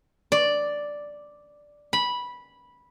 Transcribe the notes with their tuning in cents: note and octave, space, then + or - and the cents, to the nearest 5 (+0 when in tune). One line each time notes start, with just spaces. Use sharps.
D5 +0
B5 -10